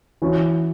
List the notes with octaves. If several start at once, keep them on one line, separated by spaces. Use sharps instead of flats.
E3 C#4 F#4